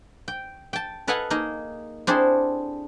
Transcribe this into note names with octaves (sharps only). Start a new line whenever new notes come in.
G5
G5 A5
A4 B4 D#5 F5 F#5 G#5
A#3 D#4 G#4 D#5
C4 D4 E4 G#4 A4